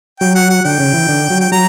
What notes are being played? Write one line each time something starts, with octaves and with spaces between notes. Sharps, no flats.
F#3 G5
F#5
F#5
D3 G5
C#3
E3
D3
F#3
G5
F#3 A#5